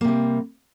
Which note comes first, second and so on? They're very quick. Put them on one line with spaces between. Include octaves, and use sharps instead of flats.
A#3 C3 G3